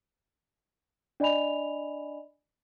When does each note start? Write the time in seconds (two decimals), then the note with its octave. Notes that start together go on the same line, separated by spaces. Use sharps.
1.20 D4 D5 D#5 G#5 B5 F7